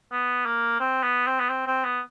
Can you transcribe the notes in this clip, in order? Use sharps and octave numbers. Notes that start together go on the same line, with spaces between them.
B3
A#3
C4
B3
C4
B3
C4
C4
B3